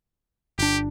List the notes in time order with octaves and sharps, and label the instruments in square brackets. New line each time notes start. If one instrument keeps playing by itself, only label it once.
[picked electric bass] G1 D4 [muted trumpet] G4